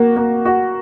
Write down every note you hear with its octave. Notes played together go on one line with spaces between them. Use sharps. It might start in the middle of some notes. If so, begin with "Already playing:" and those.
Already playing: A#3 F#4
A#3
F#4